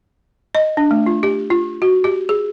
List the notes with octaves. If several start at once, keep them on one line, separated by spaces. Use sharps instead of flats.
D#5
D4
A3
F4
G4
F4
F#4
G4
G#4